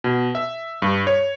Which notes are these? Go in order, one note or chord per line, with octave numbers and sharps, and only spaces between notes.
B2
E5
G2
C#5